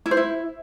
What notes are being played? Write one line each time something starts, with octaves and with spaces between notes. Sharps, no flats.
E4
C5
E4